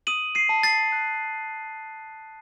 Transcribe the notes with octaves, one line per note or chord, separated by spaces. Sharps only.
D#6 D#7 F#7
C7 D#7
A5
A6 C7
F#6